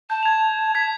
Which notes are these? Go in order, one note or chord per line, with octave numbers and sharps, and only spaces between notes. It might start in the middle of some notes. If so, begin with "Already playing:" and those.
A5 G6
G#6 F7
G#6 B6